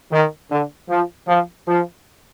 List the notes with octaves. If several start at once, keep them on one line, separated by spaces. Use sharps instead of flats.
D#3
D3
F3
F3
F3